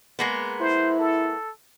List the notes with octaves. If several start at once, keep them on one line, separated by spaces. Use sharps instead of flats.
G#3 A#3 B3
E4 C5
A4